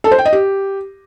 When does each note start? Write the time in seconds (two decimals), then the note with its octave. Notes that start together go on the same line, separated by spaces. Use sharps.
0.04 A4
0.11 C5
0.18 G5
0.25 D#5
0.33 G4